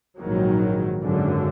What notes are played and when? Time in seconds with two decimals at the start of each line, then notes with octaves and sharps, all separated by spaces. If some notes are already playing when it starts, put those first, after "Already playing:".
0.18 A#1 G#2 D#3 F#3
1.01 G#1 F#2 D3